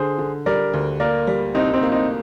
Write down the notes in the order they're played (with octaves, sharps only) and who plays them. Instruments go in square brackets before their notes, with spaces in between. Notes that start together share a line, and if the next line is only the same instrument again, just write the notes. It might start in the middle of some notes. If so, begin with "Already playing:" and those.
Already playing: [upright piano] D3 [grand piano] G#4 C5
[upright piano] D3
[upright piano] G3 [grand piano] A#4 D5
[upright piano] D2
[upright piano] A#3 [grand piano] A#4 D5
[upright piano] G3
[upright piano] C2 [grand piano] C4 D#4
[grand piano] C4 D#4
[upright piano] A#3
[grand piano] C4 D#4